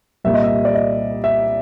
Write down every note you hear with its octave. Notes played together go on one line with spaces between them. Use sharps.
C2 A#2 G3 A#3 E5
D#5
E5
D5
D#5
E5